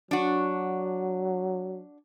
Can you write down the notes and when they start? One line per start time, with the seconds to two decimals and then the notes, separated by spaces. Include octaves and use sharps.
0.11 F#3 D4 F#4